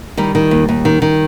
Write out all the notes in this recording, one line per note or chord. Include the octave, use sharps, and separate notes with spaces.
D#3 G3
D#3
D#2
D#2
D#3
D#3